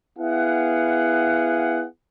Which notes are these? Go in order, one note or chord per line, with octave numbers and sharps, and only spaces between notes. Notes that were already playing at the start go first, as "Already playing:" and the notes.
B3 E4 G#4 F5 F#5